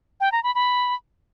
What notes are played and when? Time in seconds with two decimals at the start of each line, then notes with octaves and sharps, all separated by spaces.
0.20 G5
0.32 A#5
0.43 B5
0.55 B5